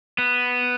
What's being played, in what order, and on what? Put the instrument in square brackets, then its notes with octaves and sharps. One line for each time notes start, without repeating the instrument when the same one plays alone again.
[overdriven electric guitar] B3